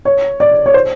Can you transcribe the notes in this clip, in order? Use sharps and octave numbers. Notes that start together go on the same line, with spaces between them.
C#5
D5
C#5
C5